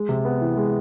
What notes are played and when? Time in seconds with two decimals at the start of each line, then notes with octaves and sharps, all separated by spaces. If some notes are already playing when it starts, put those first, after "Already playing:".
Already playing: G#3
0.09 C3
0.25 B3
0.41 E3
0.57 G#3